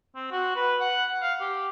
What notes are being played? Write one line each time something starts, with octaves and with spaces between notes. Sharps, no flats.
C4
F#4
B4
F#5
F5
G4